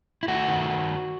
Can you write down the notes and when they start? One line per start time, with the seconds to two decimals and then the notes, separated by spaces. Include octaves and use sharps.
0.23 E4
0.28 A3 F#4
0.48 D#3